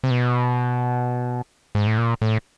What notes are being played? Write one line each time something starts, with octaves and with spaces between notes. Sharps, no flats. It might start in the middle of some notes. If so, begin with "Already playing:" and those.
C3
B2
G#2
A2
A#2
A2